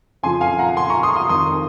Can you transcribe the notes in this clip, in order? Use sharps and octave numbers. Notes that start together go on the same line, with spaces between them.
F2 C#3 F3 G#5 C6
F5 G#5
F#5 A#5
G#5 C6
A#5 C#6
C6 D#6
C6 D#6
F2 D#3 C6 D#6